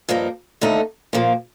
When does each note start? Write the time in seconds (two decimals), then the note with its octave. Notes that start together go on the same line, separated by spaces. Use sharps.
0.09 G2 F3 A#3 D#4
0.61 D#2 D3 A3 D#4
1.13 A#2 F3 A#3